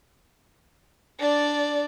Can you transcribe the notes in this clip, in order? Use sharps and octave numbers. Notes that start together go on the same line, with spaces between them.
D4 D5